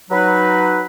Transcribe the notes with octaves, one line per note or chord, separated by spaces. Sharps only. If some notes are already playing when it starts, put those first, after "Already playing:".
F#3 D#4 B4